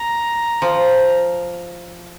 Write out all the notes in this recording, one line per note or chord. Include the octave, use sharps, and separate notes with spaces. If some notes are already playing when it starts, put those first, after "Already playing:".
Already playing: A#5
F3